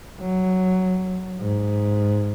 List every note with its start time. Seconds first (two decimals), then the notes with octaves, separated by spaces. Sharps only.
0.21 F#3
1.41 G#2